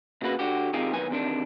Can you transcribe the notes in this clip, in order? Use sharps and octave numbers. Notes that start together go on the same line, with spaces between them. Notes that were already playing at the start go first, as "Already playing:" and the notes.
A#2 C#3 A#3 F#4 B4
D3 F#4 G4
C3 D#3 D#4 F4 G4 G#4
B1 E2 D#3 B3 G#5
E2 C3 D#3 D4